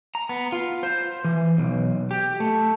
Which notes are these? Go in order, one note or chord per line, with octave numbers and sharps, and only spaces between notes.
A#5
B3
F4
C5
E3
B1
G4
A3